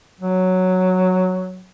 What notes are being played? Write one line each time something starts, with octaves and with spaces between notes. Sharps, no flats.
F#3